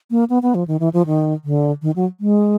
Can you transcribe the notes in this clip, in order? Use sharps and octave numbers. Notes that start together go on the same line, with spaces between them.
A#3
B3
B3
F3
D#3
E3
F3
D#3
D3
D#3
F#3
G#3